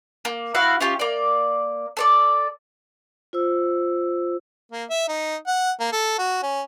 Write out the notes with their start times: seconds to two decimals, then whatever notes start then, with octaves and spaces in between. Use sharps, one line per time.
0.25 A#3
0.55 E4 F#4 F5 F#5
0.81 C#4 F4 G4
0.99 A#3 D5
1.97 A4 C#5 D5
3.33 F4 C5 E6
4.72 A#3
4.90 E5
5.09 D#4
5.47 F#5
5.80 A#3
5.92 A4
6.18 F#4
6.43 C#4